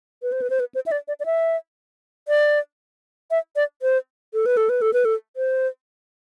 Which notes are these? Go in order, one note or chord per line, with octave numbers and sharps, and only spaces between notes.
B4
C5
B4
C5
B4
C5
E5
D5
D5
D5
E5
D5
E5
D5
C5
A4
B4
A4
B4
A4
B4
A4
C5